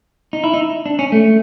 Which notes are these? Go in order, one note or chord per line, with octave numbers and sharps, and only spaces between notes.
D#4
E4
D#4
D4
C#4
A3